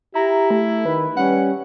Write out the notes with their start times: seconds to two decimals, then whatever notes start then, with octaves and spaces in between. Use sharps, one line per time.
0.15 E4 G4 A#5
0.50 A3
0.86 D#3 B4
1.17 G3 C#4 F#5